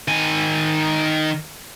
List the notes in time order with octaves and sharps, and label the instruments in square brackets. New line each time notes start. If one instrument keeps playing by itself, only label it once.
[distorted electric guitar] D#3 G#5